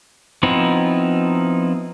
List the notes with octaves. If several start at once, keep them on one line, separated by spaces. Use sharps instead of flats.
F3 B3 C4 D#4 E4